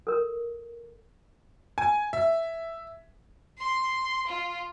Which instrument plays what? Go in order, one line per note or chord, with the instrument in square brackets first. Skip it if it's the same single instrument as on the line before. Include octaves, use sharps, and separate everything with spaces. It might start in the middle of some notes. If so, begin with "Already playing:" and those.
[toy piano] A4 A#4
[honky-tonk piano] G#5
E5
[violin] C6
F4